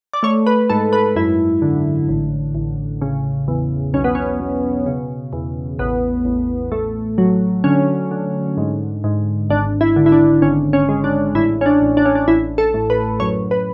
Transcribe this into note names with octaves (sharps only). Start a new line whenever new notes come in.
D5
A3 C#5
B4
G#2 A4
B4
F#2 E4
D3
A1
A1
C#3
E2
B1 C#4
B3
C#4
B2
C#3
E2
A1 B3
A1
A3
F#3
D3 C#4
D3
G#2
G#2
G#1 D4
E4
D3
E4
D4
G#1 C#4
C#4
G#3
D4
A1 E4
C#4
D4
A1
D4
C#4
D4
A1 E4
A4
A2
B4
F#2 C#5
B4